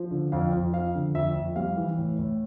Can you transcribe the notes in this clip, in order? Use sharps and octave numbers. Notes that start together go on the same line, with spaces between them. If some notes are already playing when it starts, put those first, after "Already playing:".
Already playing: F3
D3
F2 F5
F2
F3 F5
D3
F2 E5
F2
G3 F5
E3
A2
A2